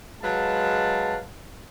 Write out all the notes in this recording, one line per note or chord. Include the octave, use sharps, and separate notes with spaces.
F#3 G#3 B4 F5 A5